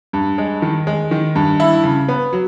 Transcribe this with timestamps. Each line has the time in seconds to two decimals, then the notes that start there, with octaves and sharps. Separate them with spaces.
0.13 G2
0.38 G#3
0.62 D#3
0.87 G#3
1.11 D#3
1.35 G2
1.60 E4
1.83 C#3
2.08 B3
2.33 F#3